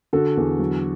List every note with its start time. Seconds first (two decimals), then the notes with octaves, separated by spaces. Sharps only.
0.13 D3 F#4 A4
0.37 E2
0.59 F#3